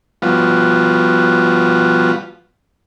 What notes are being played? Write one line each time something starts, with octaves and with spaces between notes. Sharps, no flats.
F3 G3 B3 F4 F#4